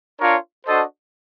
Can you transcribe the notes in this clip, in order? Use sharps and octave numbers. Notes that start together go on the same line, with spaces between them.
D4 F4 A#4 C#5
D4 F#4 A4 C5 D#5